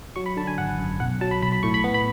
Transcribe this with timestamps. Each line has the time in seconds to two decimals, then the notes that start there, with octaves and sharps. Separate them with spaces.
0.16 F#3 C#6
0.26 B5
0.37 D3 A5
0.47 G#5
0.58 G#1 F#5
0.79 F#2
1.00 B1 F#5
1.21 F#3 A5
1.31 B5
1.42 B1 B5
1.52 B5
1.63 A2 C#6
1.74 B5
1.84 B3
1.94 B5